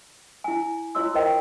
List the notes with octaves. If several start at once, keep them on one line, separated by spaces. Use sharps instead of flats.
E4 G#5
E4 F4 C#5 D#5 C6 E6
A#4 C5 D#5 G5